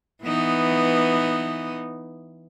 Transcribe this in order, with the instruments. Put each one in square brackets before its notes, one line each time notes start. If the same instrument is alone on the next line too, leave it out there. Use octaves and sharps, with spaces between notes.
[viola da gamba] E3 B3 D#4